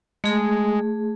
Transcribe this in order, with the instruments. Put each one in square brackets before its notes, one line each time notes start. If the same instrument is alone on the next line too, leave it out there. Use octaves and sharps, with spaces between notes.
[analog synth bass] G#3 [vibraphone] A3 G#4